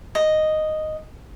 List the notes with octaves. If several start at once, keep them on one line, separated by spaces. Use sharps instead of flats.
D#5